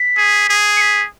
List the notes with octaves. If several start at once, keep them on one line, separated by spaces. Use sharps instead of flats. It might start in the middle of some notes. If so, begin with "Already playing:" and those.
Already playing: B6
G#4
G#4
C#7
B6